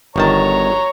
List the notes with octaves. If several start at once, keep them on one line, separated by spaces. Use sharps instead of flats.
G1 D#3 C#5 A5 A#5